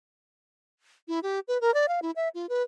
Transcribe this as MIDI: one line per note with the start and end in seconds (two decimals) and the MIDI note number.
1.08 1.19 64
1.23 1.40 67
1.48 1.60 71
1.61 1.73 70
1.74 1.86 74
1.88 2.00 77
2.02 2.11 64
2.16 2.28 76
2.34 2.46 65
2.49 2.62 71